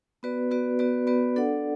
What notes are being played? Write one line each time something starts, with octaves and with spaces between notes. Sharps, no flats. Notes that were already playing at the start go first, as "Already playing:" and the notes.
B3 F#4 B4 D5
B3 F#4 B4 D5
B3 F#4 B4 D5
B3 F#4 B4 D5
D4 A4 D5 F#5